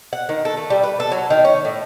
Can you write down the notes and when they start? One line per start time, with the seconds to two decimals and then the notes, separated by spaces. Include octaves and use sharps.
0.13 F#5
0.29 D#3
0.45 A4
0.57 A3
0.70 G3
0.83 B4
1.00 A4
1.12 F#3
1.30 D#3
1.45 C#4
1.65 A2